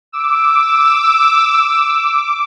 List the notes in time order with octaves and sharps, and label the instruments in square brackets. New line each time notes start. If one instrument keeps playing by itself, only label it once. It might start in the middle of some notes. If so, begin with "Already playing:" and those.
[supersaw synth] D6 [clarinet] E6